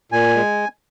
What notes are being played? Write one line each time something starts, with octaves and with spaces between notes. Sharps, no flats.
A#2 G#5
G#3